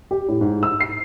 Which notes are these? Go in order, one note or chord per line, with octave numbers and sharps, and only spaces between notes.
G4
A2
G#2
E6
C7